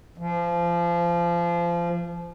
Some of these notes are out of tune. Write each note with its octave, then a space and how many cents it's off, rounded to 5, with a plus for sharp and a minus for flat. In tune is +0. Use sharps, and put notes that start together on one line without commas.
F3 -25